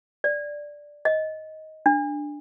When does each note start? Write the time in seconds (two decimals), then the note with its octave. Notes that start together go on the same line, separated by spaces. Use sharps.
0.24 D5
1.05 D#5
1.86 D4